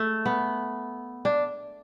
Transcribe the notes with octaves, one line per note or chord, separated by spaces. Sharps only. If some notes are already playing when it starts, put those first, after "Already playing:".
Already playing: A3
B3
D4